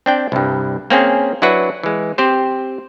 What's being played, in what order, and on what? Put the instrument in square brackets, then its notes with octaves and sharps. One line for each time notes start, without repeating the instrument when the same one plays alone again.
[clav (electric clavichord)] C4 D4 G5
C2 G2
A#3 C4 C#4 G#4
F#3 D4 E4 F#4 B4
E3 G#3
C4 G4 C5